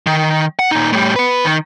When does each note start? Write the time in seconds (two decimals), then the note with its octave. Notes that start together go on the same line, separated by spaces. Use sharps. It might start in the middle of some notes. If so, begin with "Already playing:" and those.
0.07 D#3
0.59 F#5
0.71 A#2 D#4
0.92 A2 G3
1.16 B3 B4
1.45 D#3